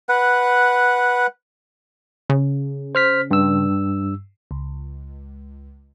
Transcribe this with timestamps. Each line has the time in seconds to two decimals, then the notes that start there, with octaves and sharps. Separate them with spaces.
0.09 B4 F#5
2.30 C#3
2.95 C5 F6 B6
3.31 G2 E6
4.51 C#2